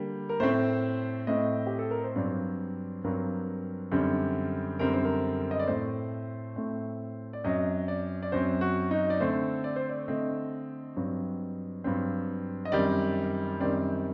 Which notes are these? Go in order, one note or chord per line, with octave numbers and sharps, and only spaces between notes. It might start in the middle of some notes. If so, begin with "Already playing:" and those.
Already playing: D3 G3 A#3
A#4
A2 A3 C4 C5
A2 A3 C4 D#5
G4
A4
A#4
C5
G2 F#3 C4 D5
G2 F#3 C4 A#4
F#2 D3 G3 C4
F#2 D3 G3 C4 A#4
C5
A#4
D#5
D5
A2 A3 C4 C5
A2 A3 C4
D5
F#2 F#3 C4 D#5
D5
D5
F#2 F#3 C4 C5
F#4
D#4
D5
D3 A3 C4 C5
D5
C5
D5
D3 A3 C4 D#5
G2 F#3 C4
G2 F#3 C4
D#5
F#2 D#3 G3 C4 D5
F#2 D#3 G3 C4 D5